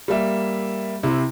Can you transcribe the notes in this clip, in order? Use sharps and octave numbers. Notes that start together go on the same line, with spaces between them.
G3 A#3 E5
C3 E4